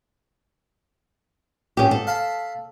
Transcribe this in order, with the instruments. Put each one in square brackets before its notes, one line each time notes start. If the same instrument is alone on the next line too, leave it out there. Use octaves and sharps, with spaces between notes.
[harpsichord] G#2 [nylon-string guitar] C#4 G4
[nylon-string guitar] A4
[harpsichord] F5 A5 B5